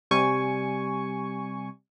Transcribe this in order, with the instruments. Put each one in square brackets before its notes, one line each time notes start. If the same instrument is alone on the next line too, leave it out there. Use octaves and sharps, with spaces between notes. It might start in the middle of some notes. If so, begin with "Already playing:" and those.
[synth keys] C3 G3 G#5 C#6